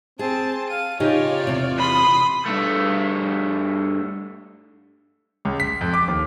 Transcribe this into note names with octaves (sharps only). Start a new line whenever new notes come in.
C4 G#4 A5
F5 D#7
C#3 D#4 F4 G4 C#5 D5
E2 C3
B5 C6 D#6
G2 A3
C#2
B6
F2
D6
D#2